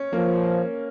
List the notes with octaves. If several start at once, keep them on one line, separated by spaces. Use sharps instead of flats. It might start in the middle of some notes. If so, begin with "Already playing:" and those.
Already playing: C#4
F3 A#3